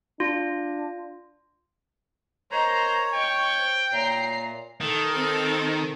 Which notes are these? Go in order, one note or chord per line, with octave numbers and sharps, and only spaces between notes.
D4 F4
A#4 C5 C#5 D#5 A#5
D#5 G5 C#6
C5
A#2 C#5 E5 A#5 C7
D#3 A4
C4 A4